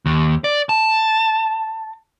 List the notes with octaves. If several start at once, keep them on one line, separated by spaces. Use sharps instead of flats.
D#2
D5
A5